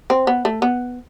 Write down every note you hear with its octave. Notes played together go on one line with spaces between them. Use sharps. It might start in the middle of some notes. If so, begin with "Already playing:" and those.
C4
B3
A3
B3